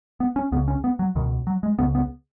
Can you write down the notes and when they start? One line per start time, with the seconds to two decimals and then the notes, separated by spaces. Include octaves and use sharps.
0.20 B3
0.36 C#4
0.52 C#2 C#3 B3
0.68 C#4
0.84 B3
0.99 F#3
1.15 C#2 B2 D#3
1.47 F#3
1.63 G#3
1.79 C#2 C#3 B3
1.95 B3